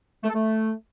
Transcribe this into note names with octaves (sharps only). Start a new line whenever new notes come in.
A3
A4
A3